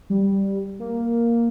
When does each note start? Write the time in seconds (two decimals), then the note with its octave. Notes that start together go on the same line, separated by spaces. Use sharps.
0.10 G3
0.80 A#3